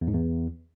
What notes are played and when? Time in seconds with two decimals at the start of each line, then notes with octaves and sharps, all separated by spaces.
0.01 E2
0.08 G#2
0.14 E2